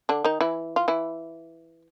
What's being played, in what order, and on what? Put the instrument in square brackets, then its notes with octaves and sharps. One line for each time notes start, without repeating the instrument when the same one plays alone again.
[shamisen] D3 D4
D#3 D#4
E3 E4
F4
E3 E4